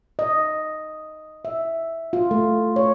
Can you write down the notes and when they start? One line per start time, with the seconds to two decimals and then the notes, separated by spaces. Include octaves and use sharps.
0.19 D#5
1.45 E5
2.13 F4
2.31 A3
2.76 C#5